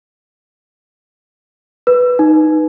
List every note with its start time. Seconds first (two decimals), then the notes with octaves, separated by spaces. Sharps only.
1.87 B4
2.19 D#4